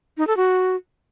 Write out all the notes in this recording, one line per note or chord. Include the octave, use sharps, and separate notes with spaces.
D#4
A4
F#4